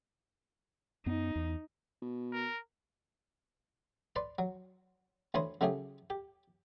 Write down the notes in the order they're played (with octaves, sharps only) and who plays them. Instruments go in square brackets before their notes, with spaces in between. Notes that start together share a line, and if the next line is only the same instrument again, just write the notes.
[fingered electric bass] F#2 B3 [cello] D#4
[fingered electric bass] E2
[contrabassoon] B2
[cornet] A#4
[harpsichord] B4 D5 C6
F#3
D2 E3 C#5 B5 C6 D#6
C#3 F#3 A3 G4 G#4
G4